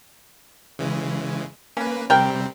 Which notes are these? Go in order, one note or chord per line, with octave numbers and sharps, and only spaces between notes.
C#3 E3 G#3
A#3 C#4 B4
C3 G3 C4 A#4 G5